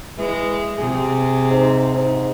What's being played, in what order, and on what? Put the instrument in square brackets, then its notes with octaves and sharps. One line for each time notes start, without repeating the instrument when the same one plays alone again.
[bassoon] E3 [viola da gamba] G#3
[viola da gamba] C3 [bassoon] G#4
[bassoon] G#2
G#2